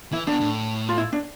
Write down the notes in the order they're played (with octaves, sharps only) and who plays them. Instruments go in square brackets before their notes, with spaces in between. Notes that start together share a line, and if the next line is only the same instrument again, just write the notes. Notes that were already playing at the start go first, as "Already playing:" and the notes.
[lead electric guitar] E3 [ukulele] E4
[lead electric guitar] B2 [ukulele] D4
[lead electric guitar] A2
[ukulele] F4
E4
D4